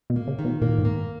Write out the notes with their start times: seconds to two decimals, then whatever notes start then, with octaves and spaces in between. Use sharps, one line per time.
0.10 B2
0.16 A#3
0.27 C#3
0.39 D#3
0.45 B2
0.62 A#2 A#3
0.78 G#2
0.85 A#3